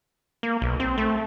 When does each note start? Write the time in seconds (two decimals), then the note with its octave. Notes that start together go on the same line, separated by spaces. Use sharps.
0.43 A#3
0.62 B1
0.80 C4
0.98 A3